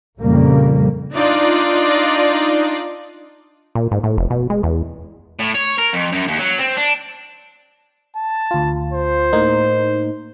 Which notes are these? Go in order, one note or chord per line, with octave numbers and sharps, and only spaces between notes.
F2 A#2 C#3 G3 A#3
D4 D#4 F4 D5
A#2
G#2
A2
F1
B2
G#3
E2
A2
C#5
A#4
F2
F#2
D#2
F#3
C4
D4
A5
D2 F4
C5
A2 A#3 D#4